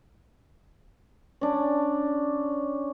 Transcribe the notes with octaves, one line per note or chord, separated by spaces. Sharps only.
C#4 D4